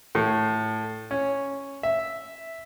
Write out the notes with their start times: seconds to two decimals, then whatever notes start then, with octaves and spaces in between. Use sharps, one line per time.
0.15 A2
1.11 C#4
1.83 E5